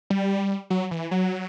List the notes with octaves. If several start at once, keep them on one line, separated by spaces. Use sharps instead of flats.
G3
F#3
E3
F#3